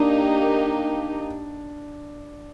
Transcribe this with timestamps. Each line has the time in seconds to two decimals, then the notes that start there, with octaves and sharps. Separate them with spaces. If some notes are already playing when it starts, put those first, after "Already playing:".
Already playing: A#3 D4 D#4 G4